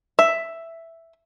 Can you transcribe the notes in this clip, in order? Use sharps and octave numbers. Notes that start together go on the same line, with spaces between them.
E5